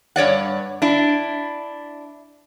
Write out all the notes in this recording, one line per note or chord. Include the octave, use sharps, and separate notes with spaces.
G2 C#5 D5 F#5
D4 E4